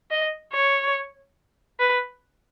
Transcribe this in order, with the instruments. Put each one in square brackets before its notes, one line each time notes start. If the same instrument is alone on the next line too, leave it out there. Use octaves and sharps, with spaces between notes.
[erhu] D#5
C#5
B4